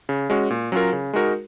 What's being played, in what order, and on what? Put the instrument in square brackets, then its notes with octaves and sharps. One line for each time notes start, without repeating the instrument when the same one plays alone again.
[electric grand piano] C#3
G#3 C#4 F#4
A#2
F#3 C#4 F4 A#4
C#3
G#3 D#4 F#4 A#4